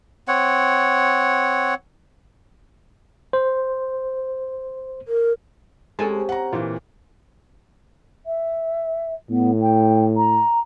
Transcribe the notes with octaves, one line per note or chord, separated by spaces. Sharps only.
C4 C#5 F#5
C5
A#4
C3 G#3 C#4 A4 G#5 A5
F#5 A#5
A#2 E3 F4
E5
A2 B3
G5
A#5